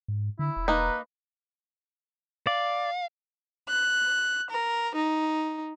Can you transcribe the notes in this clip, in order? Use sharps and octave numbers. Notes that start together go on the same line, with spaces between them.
G#2
D3 E4
E1
A#3 D#4 B4
D5 F5
F#6
A#4
D#4